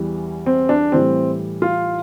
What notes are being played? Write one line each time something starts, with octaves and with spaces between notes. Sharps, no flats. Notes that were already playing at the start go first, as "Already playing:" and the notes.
Already playing: E2 E3 G3
C4
D4
A2 E3 G3 C4
F4